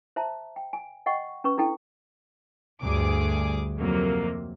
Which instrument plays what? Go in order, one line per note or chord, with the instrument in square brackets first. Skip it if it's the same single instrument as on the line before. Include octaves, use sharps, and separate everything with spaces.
[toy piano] C5 E5 A5 A#5
G5
G#5
D#5 F#5 G5 C#6
C#4 B4 C#6
D4 E4 A4 G5
[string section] D2 G2 G#4 D6
F2 C3 F#3 A#3